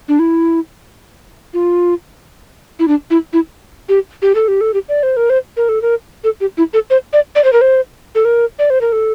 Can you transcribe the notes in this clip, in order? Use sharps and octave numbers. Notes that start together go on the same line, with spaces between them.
D4
E4
F4
E4
D4
E4
E4
G4
G4
A4
G4
A4
G4
D5
C5
A#4
C5
A#4
A4
A#4
A4
G4
E4
A4
C5
D5
D5
C5
A#4
C5
A4
A#4
D5
C5
A#4
A4